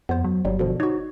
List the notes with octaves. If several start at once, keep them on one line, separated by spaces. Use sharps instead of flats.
F2 B3 C5
F#3
G1 F#3 G3
B2 D3 F3
D#4 F#4 C#5